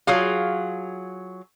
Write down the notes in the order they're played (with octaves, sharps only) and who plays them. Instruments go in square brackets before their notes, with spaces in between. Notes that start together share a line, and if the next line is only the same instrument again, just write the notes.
[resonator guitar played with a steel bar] F#3 F4 G#4 F5